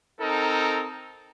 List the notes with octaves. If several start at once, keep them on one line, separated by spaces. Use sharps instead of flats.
C4 D#4 A4 A#4